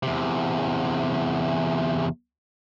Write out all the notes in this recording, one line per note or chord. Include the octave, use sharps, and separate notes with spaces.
E2 C3